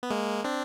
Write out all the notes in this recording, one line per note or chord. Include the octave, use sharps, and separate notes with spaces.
B3
G#3 A#3
C4 D4